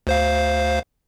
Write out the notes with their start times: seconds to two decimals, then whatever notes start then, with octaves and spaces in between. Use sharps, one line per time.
0.07 D2 C5 F5